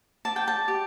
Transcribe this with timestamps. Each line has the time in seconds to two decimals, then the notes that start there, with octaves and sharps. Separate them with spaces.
0.25 D5 A5
0.36 G5
0.48 A5
0.68 G4